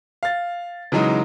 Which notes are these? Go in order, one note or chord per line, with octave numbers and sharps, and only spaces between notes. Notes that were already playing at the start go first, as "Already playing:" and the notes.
F5 A6
C#3 E3 F#3 G#3 D#4